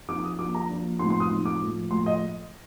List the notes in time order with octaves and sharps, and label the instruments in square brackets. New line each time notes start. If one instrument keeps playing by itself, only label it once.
[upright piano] F3 C4 D#4 D6
D#6
F3 A#3 D4 D6
A#5
F3 A#3 D4
A2 F3 C4 D#4 C6
C6
D#6
A2 F3 C4 D#4
D6
A2 F3 A3
A2 F3 A3 C6
D#5